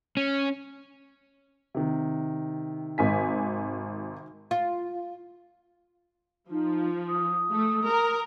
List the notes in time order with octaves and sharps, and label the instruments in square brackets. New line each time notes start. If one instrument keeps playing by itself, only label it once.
[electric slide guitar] C#4
[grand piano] C3 D#3
[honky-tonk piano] G#1 G#5 B6
[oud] F4
[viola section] F3 [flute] D#4
[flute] D#6
[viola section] A3
A#4